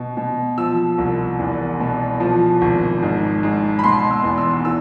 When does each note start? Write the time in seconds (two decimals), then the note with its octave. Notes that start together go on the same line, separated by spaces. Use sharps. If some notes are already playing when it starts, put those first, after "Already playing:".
Already playing: B2
0.17 B2
0.58 F3 E6
0.98 C2
1.39 E2
1.80 B2
2.20 F3
2.61 G#1
3.02 G#2
3.43 G#2
3.79 B5
3.84 B2 C6
4.11 E6
4.24 E2
4.38 E6
4.65 E3 E6